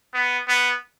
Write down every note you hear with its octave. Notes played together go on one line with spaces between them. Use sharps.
B3
B3